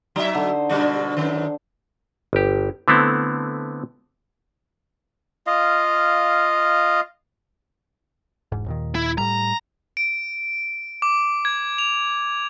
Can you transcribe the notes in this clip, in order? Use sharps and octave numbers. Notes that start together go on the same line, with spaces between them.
F#3 D#4 E5 C#6
D3 C5
B2 G3 D4
F#2 D#3
G1 G4
D3 A3 B3 C4 E4
F4 D#5 F5
E1 G#2
D#2 A#2 D#3
E4
A2 G3 A#5
D7
D6
G#6
F7